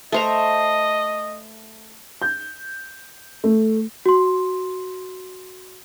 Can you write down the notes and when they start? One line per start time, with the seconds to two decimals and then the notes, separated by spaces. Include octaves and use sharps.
0.12 A3 C5 D#5 A#5
2.22 G6
3.44 A3
4.06 F#4 C6